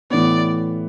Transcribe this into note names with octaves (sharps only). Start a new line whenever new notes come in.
A2 E3 B3 D5